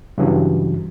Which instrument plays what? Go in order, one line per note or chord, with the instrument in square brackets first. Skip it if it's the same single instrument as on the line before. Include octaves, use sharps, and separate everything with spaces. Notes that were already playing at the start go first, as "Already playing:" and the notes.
[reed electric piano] G2 C#3 E3 F#3